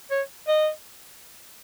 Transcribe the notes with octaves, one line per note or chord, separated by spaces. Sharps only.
C#5
D#5